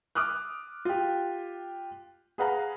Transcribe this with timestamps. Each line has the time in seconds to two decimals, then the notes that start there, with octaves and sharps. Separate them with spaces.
0.15 D6 D#6 F6 F#6
0.85 F4 G4
2.38 G#4 B4 F5 F#5 A#5